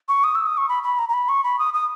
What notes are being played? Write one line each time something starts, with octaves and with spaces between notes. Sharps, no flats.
C#6
D#6
E6
D#6
C#6
B5
B5
A#5
A#5
B5
C#6
B5
D#6
D#6